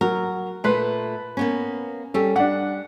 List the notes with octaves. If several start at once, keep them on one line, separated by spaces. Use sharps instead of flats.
F#3 A#4
A#2 A3 B4 C6
A#3 B3 C#4
G3 C#4 A4
G3 D4 F#5